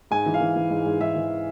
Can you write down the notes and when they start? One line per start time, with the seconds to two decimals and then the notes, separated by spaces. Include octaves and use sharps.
0.11 G#2 G#5
0.26 E3
0.34 F5
0.41 E3
0.56 E3
0.70 G#2
0.86 G#2
1.00 G#2 E5
1.16 E3